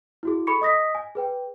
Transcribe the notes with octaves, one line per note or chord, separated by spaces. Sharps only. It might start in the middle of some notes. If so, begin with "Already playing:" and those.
E4 F#4 G#4
A4 B5 C#6 C#7
D#5 D#6 A#6 B6
G#5
G#4 B4 G5